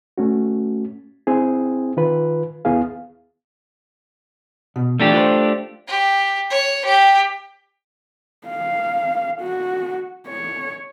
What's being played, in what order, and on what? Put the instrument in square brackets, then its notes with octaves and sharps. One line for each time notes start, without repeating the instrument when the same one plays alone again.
[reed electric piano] A3 C#4 F#4
C4 E4 G#4
D#3 F4 B4
D#2 B3 E4 G#4 F5
[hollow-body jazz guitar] B2
[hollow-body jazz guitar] E3 F4 [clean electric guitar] A3 D4 G4
[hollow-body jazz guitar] F4 B4 C5
[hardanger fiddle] G4
C#5
G4
[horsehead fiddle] F5
F#4
C#5